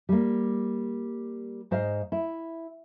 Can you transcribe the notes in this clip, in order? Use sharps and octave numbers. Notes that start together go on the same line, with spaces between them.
G3 A#3
G#2 C5 D#5 F5
E4